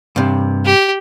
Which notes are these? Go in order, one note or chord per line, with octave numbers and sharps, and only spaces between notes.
G2 C3
G4